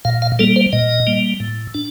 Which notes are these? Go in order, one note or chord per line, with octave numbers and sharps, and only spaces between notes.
A#2 F5
F5
G3 A#3 A4
C5
A#2 D#5
G3 A#3
A2
D4